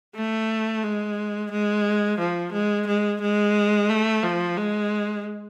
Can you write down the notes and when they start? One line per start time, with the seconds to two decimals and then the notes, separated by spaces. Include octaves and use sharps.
0.16 A3
0.84 G#3
1.52 G#3
2.19 F3
2.53 G#3
2.87 G#3
3.21 G#3
3.90 A3
4.23 F3
4.58 G#3